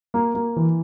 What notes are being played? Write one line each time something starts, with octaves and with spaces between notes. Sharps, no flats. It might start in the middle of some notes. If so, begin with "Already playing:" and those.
A#3
A#3
E3